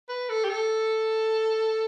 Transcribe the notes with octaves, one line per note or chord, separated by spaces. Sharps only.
B4
A4
G4
A4